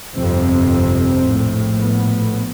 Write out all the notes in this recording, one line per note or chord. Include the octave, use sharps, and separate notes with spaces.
G1 F2 C3 C4
A#1 A2
B3